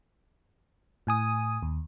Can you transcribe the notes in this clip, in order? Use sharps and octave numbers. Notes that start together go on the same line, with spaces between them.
A2 G#5 D#6
D#2